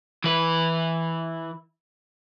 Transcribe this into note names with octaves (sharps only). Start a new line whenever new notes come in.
E3 B4